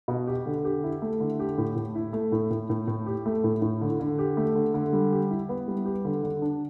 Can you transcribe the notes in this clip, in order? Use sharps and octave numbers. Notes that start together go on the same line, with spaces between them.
B2
G4
D3
G4
E4
A3
D3
G4
A2
A2
E4
A3
A2
A2
A2
A2
G4
A3
A2
A2
D3
D3
G4
A3
D3
D3
G3
G4
E4
B3
G3
G4
D3
D3
D4